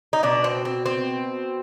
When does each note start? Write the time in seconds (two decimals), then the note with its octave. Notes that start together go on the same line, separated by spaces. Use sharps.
0.13 D#4
0.23 B2 B3 D4
0.44 C4
0.65 C4
0.86 C4